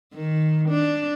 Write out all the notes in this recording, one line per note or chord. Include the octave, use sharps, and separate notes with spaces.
D#3
D4